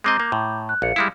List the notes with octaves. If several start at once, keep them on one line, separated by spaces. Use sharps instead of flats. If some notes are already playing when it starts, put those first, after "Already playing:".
G#3 C4 D#5 A#5 D6 G6
A#3
A2
F#6
A#1 F5 C#7
G3 G#3 E4